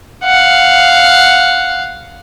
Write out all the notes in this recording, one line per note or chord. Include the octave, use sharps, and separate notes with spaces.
F5 F#5